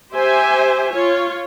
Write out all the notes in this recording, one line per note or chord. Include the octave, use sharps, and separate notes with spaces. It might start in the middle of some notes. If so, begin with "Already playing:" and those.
G4 C5 E5 G#5
F4 C#5